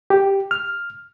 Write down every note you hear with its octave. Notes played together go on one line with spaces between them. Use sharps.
G4
F6